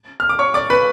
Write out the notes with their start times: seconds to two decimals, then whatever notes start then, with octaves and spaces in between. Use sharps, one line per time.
0.20 F6
0.29 D6
0.39 C#5 C#6
0.54 D5 D6
0.70 B4 B5